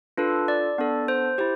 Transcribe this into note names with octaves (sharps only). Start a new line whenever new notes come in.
D4 F4 A4 B4
D5
B3 D4 A4
C5
E4 G4 C5